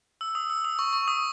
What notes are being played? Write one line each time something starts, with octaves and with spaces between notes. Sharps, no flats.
E6
D#6
E6
D#6
C#6
C#6
D#6